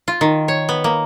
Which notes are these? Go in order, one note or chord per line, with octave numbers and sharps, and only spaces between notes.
F4
D#3
C#5
B3
A#3